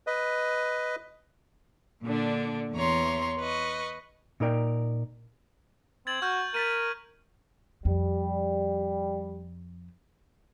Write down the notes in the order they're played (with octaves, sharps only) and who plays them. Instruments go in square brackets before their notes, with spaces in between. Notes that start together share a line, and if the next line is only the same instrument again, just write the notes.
[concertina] B4 D#5
[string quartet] A#2 D3 D4
E2 E3 C#5 A#5 C6
B4 D#5 C#6
[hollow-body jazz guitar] A#2 D#4 A#4 D5 G5
[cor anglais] C4 [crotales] G#6 A6 F#7
[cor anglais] F#4 [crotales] C#6 F6 G6
[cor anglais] A#4 [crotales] A6 B6 D#7
[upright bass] F2 [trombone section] G3